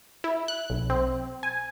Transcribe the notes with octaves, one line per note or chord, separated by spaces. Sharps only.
E4
F#6
B1
C4
G#5